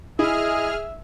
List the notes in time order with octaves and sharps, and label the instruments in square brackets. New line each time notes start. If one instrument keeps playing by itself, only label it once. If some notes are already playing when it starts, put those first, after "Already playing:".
[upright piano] E4 [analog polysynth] G#4 F6 [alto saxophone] D#5 [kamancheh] E5